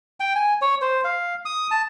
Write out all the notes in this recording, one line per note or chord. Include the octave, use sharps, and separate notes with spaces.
G5
G#5
C#5
C5
F5
D#6
A5